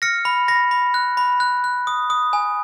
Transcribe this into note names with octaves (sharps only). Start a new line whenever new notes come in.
F6 A#6 C#7
B5
B5 A#6
B5
F#6
B5
F#6
F#6
D#6
D#6
G#5